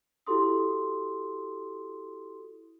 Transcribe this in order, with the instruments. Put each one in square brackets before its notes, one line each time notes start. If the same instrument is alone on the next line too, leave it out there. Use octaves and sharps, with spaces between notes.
[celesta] E4 F#4 G4 A4 C6 D#6